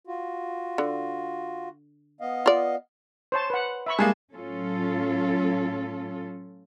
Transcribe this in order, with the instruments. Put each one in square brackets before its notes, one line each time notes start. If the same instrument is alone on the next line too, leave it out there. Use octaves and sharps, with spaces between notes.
[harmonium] F4 F#4
[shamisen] D3
[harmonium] B3 D#5 F5
[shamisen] F4 D5
[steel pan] C5 C#5 A5
B4 F#5
E5 B5 C#6
[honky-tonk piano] G3 G#3 A#3 [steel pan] G#4 G#5 A5
[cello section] A2 F#3 C#4 F4 A4